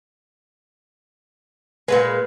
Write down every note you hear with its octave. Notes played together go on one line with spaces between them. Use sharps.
A#2 D3 G#3 B4